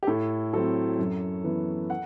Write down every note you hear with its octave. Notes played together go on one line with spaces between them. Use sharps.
G4
A2 A4
F#3 C4 A4
F#2
E3 B3
F#5